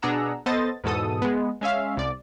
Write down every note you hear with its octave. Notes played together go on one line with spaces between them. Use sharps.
B2 D4 G#4 F#5 A#5 E6
B3 A4 C5 D#5 A6
E2 G#2 B2 A4 D#6
G#3 B3
G#3 C#4 E5 F5
C2 D5